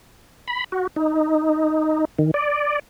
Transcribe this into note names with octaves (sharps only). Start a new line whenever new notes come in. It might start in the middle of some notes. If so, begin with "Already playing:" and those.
B5
F#4
D#4
D#3
D5